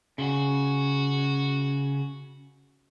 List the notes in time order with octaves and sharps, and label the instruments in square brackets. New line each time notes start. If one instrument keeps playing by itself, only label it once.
[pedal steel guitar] C#3 [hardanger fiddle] F#4